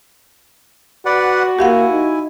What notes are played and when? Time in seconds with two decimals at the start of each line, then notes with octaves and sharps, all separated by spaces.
1.06 F#4 B4 D5 F#5
1.59 A#3 E4 G4 F5 F#5 G#5
1.92 D#4